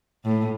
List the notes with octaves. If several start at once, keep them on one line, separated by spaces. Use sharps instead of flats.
A2